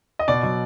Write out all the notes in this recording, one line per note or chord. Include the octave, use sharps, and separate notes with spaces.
D#5
B2 D5
F#3